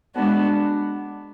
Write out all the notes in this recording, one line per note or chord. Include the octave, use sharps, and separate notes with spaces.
G#3 B3 D4 F#4